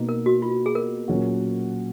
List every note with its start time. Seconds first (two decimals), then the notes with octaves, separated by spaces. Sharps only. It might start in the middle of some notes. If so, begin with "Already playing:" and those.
Already playing: B2 A#3 D#4
0.09 A#4
0.26 F#4
0.42 F4
0.66 G#4
0.75 A#4
1.08 A#2 F#3 C#4 F#4